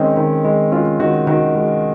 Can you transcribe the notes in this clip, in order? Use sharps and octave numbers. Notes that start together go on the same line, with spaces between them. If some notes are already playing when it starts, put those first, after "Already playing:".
Already playing: D#3 G#3 C4 C#4 D#4
D#3
G#3
G#3 C#4 F4
D#3 D#4 F#4
D#3 D#4 F#4
G#3